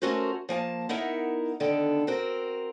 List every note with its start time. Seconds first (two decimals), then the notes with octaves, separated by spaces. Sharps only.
0.02 A3 C#4 F#4 A#4 C5
0.49 F3 A#3 G#5 A5
0.89 B3 D#4 E4 A#4 E5 F#5
1.60 D3 D#3 B3 D4 A4
2.07 C4 F#4 A#4